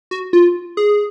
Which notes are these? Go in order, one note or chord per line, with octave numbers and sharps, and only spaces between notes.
F#4
F4
G#4